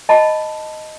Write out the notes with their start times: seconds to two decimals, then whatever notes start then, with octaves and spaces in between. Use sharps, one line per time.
0.09 D#5 A5 B5